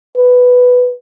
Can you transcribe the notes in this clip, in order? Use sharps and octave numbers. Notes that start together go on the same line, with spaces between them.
B4